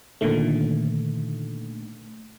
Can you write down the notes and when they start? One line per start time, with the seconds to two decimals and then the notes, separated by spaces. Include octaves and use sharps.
0.21 A#2 D3 D#3 A3